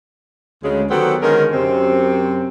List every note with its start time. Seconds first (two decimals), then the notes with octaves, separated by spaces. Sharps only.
0.63 D2 C#3 G#3
0.91 D#3 F#3 B3 C4 G4 A4
1.22 D3 D#3 G#3 C#4 A#4
1.53 F#2 C3 C4